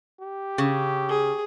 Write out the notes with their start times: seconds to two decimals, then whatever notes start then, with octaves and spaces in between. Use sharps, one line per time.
0.20 G4
0.58 C#3
1.09 G#4